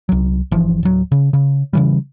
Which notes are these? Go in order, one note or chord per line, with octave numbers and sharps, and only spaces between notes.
C2 F#3
G1 E3 F3
D1 F#3
C#3
C#3
C#3 E3 G3